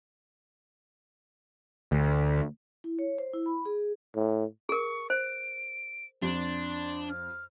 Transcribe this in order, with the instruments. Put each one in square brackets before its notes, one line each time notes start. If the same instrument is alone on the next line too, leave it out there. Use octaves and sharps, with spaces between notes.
[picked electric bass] D2
[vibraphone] E4
C#5
C5
E4
B5
G#4
[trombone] A2
[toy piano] G#4 A#4 [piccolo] C#6
[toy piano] C5 [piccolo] D7
[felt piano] F2 [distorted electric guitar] D4 [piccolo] C6
[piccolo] F6